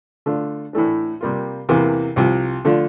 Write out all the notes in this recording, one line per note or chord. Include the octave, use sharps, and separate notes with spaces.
D3 A3 D4 F4
A2 E3 A3 D4
C3 G3 A#3 F4
E2 C3 E3 A#3
C2 C3 F3
D3 F3 A3 D4 F4